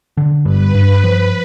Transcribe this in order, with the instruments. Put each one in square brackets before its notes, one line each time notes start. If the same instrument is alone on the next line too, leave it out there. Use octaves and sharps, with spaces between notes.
[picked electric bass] D3
[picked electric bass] G2 [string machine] B4
[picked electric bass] G2
F3